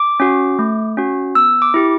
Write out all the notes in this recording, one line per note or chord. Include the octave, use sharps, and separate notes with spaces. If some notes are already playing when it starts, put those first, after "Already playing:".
Already playing: D6
C#4 F#4
A3
C#4 F#4
B3 E6
D6
E4 G4